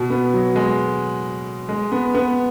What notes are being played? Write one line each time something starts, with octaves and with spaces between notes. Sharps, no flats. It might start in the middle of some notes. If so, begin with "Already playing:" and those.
Already playing: B2
B3
F#3
G#3
G#3
B3
B3